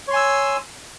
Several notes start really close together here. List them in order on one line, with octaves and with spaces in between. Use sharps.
C#5 C6 G#5 E6